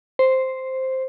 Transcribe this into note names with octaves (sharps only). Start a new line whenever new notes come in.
C5